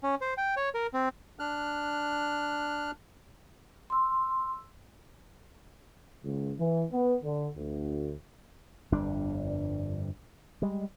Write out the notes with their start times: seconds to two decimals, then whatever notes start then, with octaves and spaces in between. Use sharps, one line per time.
0.03 C#4
0.21 C5
0.38 G5
0.57 C#5
0.74 A#4
0.94 C4
1.39 D4 F6 F#6
3.90 C6 E6
6.24 C#2
6.58 E3
6.91 B3
7.24 D3
7.57 D2
8.92 G1 F2 G3 D4
10.62 G3 G#3